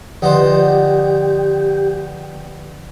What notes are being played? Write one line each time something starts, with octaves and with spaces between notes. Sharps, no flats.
D3 F3 B3 D#4 G4 C5 D5 G5